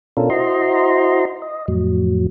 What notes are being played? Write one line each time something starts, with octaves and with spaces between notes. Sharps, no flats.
B2 C#4 D4 F4 A4 A#4
E4 F#4 C5 D#5 A#5 C6
D#5
F2 A2 F#3